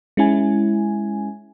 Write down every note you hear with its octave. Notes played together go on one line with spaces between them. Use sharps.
G#3 C#4 E4 G#5